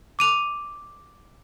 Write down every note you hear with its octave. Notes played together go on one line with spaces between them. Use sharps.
D6 D#7 F7